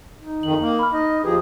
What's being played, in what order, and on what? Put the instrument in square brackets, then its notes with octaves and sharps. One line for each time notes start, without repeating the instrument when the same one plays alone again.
[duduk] D#4
[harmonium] F2 D#3 [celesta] F#7
[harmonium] A#3
[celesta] B5 F6
[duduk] D#4 [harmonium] D#5
[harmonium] D#2 F3 G#4 [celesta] F4 B4 [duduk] G4